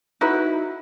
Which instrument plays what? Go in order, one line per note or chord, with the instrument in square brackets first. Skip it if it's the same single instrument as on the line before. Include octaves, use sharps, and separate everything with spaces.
[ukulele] D#4 E4 F#4 B4